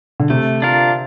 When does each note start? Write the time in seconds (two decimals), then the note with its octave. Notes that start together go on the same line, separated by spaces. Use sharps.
0.20 D3
0.30 C3 A3
0.62 D4 F4 A#4